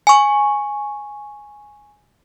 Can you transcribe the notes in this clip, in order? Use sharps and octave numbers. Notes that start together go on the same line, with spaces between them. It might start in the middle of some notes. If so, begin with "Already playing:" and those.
G#5 C#6